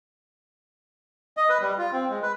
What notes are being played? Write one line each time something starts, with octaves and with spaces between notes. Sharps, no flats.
D#5
B4
G3
F4
C4
G#3
B4